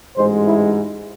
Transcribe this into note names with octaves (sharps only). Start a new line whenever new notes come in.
A1 G#2 G#3 C5
E4